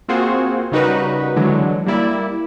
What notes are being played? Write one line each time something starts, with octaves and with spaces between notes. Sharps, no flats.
A#3 C4 F4 F#4 G#4 C5
C#3 G3 D#4 F#4 A#4 B4
D3 E3 F#3 G#3 D4
G3 A#3 E4 D5